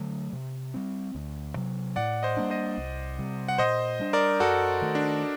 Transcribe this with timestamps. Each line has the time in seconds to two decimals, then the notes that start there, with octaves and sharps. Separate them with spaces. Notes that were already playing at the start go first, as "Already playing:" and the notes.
Already playing: D3 F#3 A3
0.33 C3
0.74 G3 C4
1.15 D2
1.55 C3 F#3
1.96 A2 D5 F#5
2.23 C5 D#5
2.37 G3 A#3 D4
2.50 C5 D#5
2.78 C2
3.19 C3 G3
3.48 F#5
3.58 A#2 C5 D#5
3.99 G3 D4
4.13 A#4 D5
4.40 F#2 F#4 A4
4.82 D#3 A3
4.95 D4